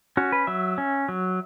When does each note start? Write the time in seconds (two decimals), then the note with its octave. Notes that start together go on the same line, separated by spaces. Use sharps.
0.17 C#4 F#4
0.32 B4
0.47 F#3 E5
0.78 C#4
1.09 F#3